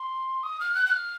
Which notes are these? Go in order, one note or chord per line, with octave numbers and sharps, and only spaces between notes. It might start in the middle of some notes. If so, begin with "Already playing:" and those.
Already playing: C6
D#6
F6
F#6
F#6
F6